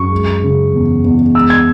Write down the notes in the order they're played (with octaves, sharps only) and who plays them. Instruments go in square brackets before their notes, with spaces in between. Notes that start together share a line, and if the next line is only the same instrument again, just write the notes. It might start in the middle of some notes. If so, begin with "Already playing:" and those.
Already playing: [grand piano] F#2 C#6
G#3
C#3
E2
E2
G#3 E6
G#6